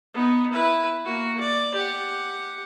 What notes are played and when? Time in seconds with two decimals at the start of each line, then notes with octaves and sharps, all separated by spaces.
0.14 B3 D#4
0.52 E4 B4
1.05 A#3 F#4
1.41 D5
1.75 G4 F#5